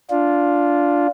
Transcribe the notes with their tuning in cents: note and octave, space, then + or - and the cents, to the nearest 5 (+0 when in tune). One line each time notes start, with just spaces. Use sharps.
D4 -10 F4 +0